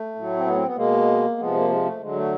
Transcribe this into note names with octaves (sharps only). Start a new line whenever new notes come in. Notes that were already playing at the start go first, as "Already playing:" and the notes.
Already playing: A3
A2 F#3
C4
B3
C4
B3
B2 G#3 A#3
C3 F3 G#3 B3
A#3
G#3
A3
D3 F#3 G#3
A3